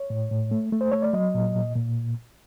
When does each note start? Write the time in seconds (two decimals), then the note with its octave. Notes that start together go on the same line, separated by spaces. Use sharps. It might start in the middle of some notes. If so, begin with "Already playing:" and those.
Already playing: C#5
0.10 A2
0.31 A2
0.51 A3
0.72 A3
0.81 C5
0.92 A3 C#5
1.02 D5
1.13 F#3 D#5
1.34 A#2
1.55 A#2
1.75 A#2